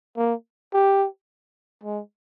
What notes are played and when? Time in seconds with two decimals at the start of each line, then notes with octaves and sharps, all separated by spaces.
0.18 A#3
0.74 G4
1.84 G#3